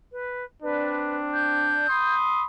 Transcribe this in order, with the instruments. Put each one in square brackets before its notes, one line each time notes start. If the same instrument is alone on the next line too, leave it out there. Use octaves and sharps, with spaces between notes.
[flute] B4
[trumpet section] C4 D4 [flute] B4
[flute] G6
[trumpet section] B5 C6 D#6